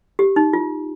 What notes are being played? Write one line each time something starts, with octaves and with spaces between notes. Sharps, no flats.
G4
D#4
F4